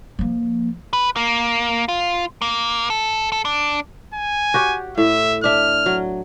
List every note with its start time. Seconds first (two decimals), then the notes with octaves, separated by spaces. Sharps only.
0.19 F3 A#3
0.93 B4
1.16 A#3
1.89 F4
2.42 A#3
2.90 A4
3.32 A4
3.45 D4
4.14 G#5
4.54 F#4 G4 C#5
4.98 A2 E5
5.44 D4 E5 F6
5.86 F#3